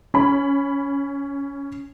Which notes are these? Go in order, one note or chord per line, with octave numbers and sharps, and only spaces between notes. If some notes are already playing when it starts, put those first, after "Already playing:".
C#4 B5